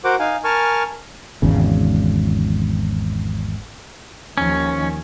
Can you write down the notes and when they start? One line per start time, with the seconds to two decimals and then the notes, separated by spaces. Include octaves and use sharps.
0.04 F#4 A#4 C5 F#5 D6
0.19 D#4 F5 G#5
0.44 A#4 G#5 A5 C#6 F6
1.42 G#1 E2 C#3
4.38 D#2 D#3 F3 C#4